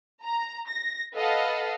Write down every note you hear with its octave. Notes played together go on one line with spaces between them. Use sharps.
A#5
A#6
A4 B4 D#5 F5 F#5